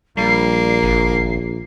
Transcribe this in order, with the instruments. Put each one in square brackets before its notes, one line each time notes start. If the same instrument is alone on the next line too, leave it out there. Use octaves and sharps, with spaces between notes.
[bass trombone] A#1 [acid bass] G3 [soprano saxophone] A#3 [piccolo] C7
[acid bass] G#1